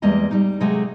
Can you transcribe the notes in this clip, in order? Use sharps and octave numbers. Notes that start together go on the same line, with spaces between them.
E2 G3 G#3 A#3 D#5 A#5
G3 D#4
C3 F#3 G#3 A3 D#4 G#4